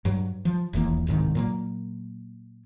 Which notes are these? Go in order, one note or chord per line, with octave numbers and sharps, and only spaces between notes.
G2 F#3
F3
D#1 B1 E2 A#3
D1 C2 G#2 D#3
A#2 F#3 A#3